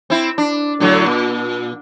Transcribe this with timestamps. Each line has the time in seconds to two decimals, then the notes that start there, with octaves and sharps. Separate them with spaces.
0.10 C4 E4
0.38 D4
0.80 A2 D3 F#3
1.06 A#2